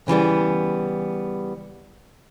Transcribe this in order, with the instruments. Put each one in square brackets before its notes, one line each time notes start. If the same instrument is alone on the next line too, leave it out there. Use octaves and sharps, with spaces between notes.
[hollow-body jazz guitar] C#3 E3 G3 B3